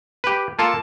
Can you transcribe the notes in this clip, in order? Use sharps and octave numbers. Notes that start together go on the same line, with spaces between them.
G4 B4
A#3 F4 A4 A5